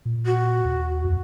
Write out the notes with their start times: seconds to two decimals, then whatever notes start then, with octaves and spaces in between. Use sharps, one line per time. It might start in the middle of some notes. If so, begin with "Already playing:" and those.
0.05 A#2
0.26 F#4
0.65 D#2
1.04 F2